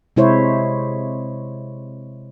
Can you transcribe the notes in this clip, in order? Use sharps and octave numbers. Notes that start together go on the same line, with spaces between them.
C3 G#3 E4 C5 C#5